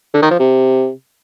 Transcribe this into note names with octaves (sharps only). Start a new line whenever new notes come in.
D3
D#3
F3
C3